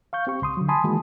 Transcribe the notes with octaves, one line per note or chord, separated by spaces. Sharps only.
F5 C#6 G6
C4 G4 C#6
C#2 C6 D#6
D3 F#3
G#5 A5 B5 C6 D#6
D#3 E3 G#3 A#3 F#4